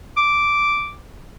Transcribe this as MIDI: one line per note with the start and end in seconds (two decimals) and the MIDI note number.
0.17 0.93 86